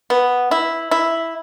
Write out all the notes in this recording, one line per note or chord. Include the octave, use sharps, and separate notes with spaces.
B3
E4
E4